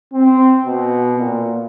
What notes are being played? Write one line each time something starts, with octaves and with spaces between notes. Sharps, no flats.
C4
B2
A#2